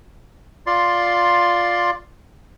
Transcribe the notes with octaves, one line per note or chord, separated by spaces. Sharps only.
F4 D5 C6